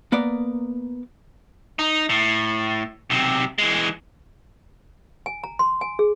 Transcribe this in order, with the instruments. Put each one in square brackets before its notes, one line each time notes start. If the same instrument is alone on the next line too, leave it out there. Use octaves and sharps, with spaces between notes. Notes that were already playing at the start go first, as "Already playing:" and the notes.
[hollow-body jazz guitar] A#3 B3 A#4 D5
[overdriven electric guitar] D#4
A2
B1 C3
E3 G#3
[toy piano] G#5
A#5
C6
G#5
G#4